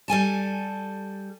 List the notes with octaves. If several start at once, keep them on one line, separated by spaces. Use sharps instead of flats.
G3 A4 G#5 A5